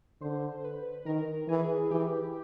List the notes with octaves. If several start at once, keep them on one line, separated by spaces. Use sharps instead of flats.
D3 C5
B4
D#3 A#4
E3 G#4
E3 G4